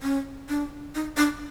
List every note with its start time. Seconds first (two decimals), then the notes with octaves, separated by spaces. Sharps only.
0.03 C#4
0.49 D4
0.95 D#4
1.17 D4